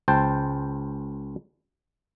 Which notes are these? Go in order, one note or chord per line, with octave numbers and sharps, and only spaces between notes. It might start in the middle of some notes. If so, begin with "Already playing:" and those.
C#2 C5 G5 A5